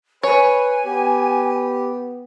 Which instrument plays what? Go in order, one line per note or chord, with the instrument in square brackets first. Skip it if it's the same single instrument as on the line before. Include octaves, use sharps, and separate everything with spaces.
[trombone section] B4 [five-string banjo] C#5 [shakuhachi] G#5
[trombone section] B3 [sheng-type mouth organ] G4